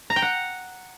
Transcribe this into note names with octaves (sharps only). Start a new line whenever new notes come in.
A#5
G5
F#5